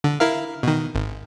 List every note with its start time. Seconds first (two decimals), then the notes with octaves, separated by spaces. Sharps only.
0.04 D3
0.20 E4 A#4 F5
0.63 B2 D#3
0.95 G#1